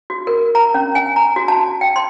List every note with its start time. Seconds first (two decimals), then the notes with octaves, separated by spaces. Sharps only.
0.10 F#4
0.27 A#4
0.55 A#5
0.74 C#4
0.95 G#5
1.16 A#5
1.36 F#4
1.48 A5
1.81 G5
1.96 C6